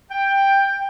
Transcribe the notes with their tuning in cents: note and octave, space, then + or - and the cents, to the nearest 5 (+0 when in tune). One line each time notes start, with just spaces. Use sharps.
G5 +10